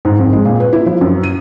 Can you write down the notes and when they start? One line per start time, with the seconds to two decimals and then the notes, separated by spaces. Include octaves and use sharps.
0.05 G#2
0.19 F2
0.33 G#3
0.45 A#2
0.60 B4
0.73 E4
0.86 F3
1.01 F#2
1.23 D#7